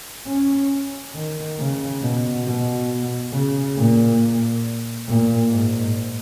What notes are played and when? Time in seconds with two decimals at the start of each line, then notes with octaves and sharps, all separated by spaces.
0.27 C#4
1.15 D#3
1.59 C#3
2.02 B2
2.46 B2
3.33 C#3
3.77 A#2
5.07 A#2
5.51 G#2